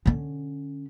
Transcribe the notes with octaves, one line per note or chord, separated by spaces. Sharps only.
D3 C#4